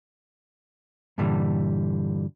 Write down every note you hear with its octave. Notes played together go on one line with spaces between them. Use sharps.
G2 A#2 D3 E3 G3